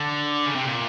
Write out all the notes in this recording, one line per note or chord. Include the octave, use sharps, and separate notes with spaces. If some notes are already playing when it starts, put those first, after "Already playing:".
Already playing: D3
C#3
C3
A#2